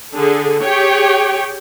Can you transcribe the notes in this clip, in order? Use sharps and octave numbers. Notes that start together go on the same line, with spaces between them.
D3 G#4 A4
G4 G#4 C#5 G5